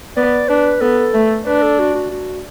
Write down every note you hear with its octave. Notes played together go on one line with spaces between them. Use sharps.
B3 D5
D4 B4
B3 A4
A3
D4 B4
A4
F#4
F#4
F#4